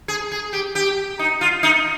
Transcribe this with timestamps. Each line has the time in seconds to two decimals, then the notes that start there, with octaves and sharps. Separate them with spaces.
0.08 G#4
0.32 G#4
0.53 G4
0.75 G4
1.19 D#4
1.41 F4
1.63 D#4